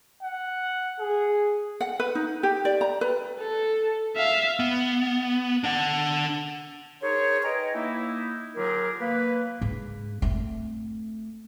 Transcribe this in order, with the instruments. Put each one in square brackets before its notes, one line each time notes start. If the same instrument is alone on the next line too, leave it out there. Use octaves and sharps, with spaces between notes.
[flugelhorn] F#5
G#4
[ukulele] F#5
B4
D#4
G4
D5
A#5
B4
[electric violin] A4
E5 F5
[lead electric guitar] B3
D4 F#5
[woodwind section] D#4 G#4 A#4 C5 C#5
B4 D#5 G5 G#5 A#5
A#3 D#4 E4
D3 F#3 F4 G4 G#4 A#4
A#3 B4
[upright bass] G#2
A3 C4